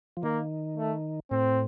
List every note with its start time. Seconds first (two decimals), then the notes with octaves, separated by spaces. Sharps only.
0.17 F3
0.23 D#3 A#3
0.77 A3
1.31 A2 C4